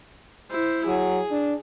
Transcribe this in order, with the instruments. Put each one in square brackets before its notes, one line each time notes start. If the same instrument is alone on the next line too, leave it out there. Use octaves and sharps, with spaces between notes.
[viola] E4 C5
[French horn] F#3 [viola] G#4
[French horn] D4